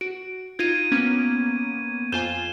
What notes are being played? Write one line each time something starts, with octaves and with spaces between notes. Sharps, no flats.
F#4 D7
D#4 F4 G#6 D#7
A#3 B3 C#4 G#6
F2 F4 G#5 G6 E7 G7